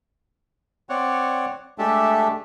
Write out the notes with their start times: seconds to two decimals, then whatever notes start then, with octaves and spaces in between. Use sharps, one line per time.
0.89 C4 C#5 D5 F#5
1.78 G#3 A3 D4 G4 A4 E5